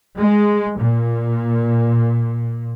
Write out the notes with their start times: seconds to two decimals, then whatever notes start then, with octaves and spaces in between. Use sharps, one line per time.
0.16 G#3
0.80 A#2